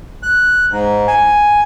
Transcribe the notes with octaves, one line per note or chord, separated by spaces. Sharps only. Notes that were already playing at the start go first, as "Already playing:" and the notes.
F#6
G#2
G#5